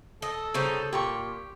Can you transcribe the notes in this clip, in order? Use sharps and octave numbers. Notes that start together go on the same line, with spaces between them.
A4 D#5
C#3 G3 D#4 C5 C#5 D6
A#2 G4 C6 C#6